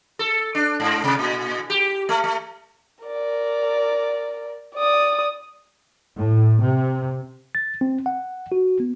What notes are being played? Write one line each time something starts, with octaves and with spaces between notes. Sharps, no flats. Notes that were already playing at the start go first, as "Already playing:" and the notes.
A4
D4
G#2
C3
A#2
G4
A3
A3
A#4 D5
D5 D#6
A2
C3
A6
C4
F#5
F#4
B3